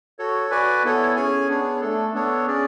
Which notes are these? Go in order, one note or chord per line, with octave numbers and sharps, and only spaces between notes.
F#4 A4 C#5
F#4 B4 D5 G#5
B3 E4 A4 C#5
C#4 G#4 C#5 G#5
B3 D4 G#4 C#5
A3 D4 A4
B3 D4 A4 C#5
C#4 G#4 D5